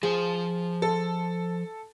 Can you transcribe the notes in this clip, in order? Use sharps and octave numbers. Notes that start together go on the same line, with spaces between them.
F3 G#4 C5
A4